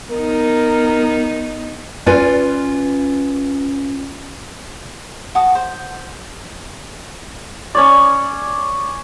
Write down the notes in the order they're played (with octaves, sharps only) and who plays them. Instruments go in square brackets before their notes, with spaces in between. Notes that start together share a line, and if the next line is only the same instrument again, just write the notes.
[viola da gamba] B3 D#4 [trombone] A#4
[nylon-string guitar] C#4 F4 B4 D5 G#5
[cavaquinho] F#4 A5 D#6
C5
[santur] C#4 C#5 D5